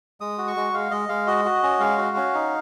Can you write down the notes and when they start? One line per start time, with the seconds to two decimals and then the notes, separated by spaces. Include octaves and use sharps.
0.21 G#3 D#6
0.38 F#4
0.48 C#6
0.56 G#3
0.73 G#3 F5
0.91 G#3 D#5
1.09 G#3 F5
1.27 F#4 D#5
1.45 F#4
1.63 C#4
1.80 G#3 F5
1.98 F#4
2.17 C#4
2.34 D#4